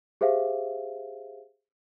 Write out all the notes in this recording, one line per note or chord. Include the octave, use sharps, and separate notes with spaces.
G4 G#4 C5 E5 F5